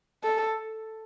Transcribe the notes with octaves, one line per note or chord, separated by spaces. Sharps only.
A4